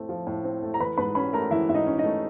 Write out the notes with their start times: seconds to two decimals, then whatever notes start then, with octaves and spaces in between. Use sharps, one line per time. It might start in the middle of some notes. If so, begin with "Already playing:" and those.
Already playing: A2 A3 C4
0.09 F3
0.27 A2
0.44 C4
0.63 A3
0.74 A#5
0.80 E3 B4 B5
0.97 G#2 B4 B5
1.15 C#4 B4 B5
1.33 A3 A#4 A#5
1.51 E3 E4 E5
1.69 G#2 E5
1.74 D#4 D#5
1.86 C#4
1.98 D#4 D#5
2.04 A3